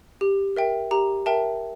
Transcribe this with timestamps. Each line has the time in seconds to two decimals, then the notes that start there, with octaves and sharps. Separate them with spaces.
0.21 G4
0.56 A#4 E5 G5
0.91 G4 A#5
1.26 A#4 E5 G5 A5